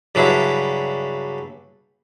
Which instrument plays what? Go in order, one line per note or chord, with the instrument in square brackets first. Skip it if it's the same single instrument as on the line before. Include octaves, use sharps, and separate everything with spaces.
[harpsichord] G2 C#3 F#3 D4 E4